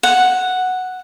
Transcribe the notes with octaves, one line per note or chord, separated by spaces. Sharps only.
F#5